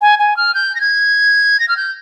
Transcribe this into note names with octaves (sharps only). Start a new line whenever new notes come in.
G#5
G#5
F6
G6
A#6
G#6
A#6
F6
G6